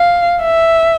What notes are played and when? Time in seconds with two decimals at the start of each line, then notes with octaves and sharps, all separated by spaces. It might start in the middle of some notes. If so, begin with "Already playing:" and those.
Already playing: F5
0.40 E5